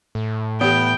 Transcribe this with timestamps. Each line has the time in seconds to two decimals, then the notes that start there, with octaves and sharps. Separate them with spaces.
0.15 A2
0.61 E3 B3 G4 G5